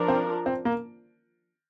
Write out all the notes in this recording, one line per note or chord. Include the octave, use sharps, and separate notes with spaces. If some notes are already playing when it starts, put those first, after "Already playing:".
Already playing: F3 D4 A#4
C4
C4
A#3